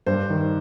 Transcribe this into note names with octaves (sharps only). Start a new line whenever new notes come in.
G2 C5
D#3